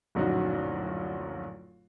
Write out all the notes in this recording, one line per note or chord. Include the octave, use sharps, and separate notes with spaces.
D1 A#1 F#2 D#4 F#4